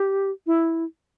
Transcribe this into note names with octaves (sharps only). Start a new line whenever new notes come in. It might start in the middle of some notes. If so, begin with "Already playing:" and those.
Already playing: G4
E4